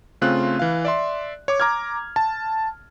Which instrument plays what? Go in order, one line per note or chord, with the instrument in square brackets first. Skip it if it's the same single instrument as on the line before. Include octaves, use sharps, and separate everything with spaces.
[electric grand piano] C#3 A3 C4 F4 F#6
E3 F5
D5 E5 C6
C#5 D6
A#5 D6 F6 G#6
A5